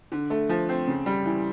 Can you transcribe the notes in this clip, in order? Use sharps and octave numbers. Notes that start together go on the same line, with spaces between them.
D3
A3
F3
C4
C#3
G3
E3